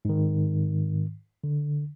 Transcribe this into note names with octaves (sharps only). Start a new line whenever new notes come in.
G#2 D#3
D3